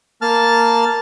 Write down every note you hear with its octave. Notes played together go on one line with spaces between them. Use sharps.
A#3 A5 F6